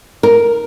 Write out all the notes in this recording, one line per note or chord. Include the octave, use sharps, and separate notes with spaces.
A#4